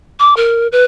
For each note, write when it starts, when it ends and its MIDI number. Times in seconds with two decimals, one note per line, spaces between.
0.19 0.34 86
0.36 0.67 70
0.72 0.85 71